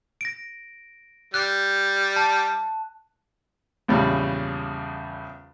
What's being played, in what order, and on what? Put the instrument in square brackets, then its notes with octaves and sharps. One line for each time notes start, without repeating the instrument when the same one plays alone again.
[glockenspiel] A#6 D7
[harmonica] G3 [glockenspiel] F#6
[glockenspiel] A5
[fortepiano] A#1 E2 C#3 G3